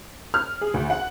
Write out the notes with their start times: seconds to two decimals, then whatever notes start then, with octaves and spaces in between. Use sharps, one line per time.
0.34 F6
0.61 G#4
0.74 D2
0.90 F#5